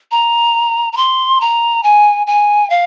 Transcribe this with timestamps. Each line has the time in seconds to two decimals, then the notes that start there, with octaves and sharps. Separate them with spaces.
0.11 A#5
0.93 A#5
0.97 C6
1.41 A#5
1.83 G#5
2.27 G#5
2.70 F5